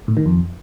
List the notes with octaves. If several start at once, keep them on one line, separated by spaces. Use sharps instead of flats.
A2
D#3
F2